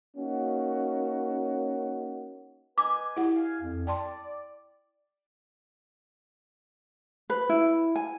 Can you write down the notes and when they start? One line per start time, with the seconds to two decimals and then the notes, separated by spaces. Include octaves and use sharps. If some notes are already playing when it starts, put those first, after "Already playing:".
0.17 A#3 C#4 D#4 F#4
2.78 B4 D#5 G#5 D6
3.16 E4 G4 F#5
3.36 F5 G#5
3.61 F2
3.87 D5 G5 A5 C6
7.30 B4
7.49 E4
7.96 G#5